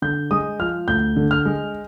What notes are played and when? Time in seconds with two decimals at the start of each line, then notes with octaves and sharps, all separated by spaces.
0.02 D3 G6
0.31 G#3 D#6
0.59 F3 F6
0.88 D2 G6
1.16 D3
1.31 F6
1.45 G#3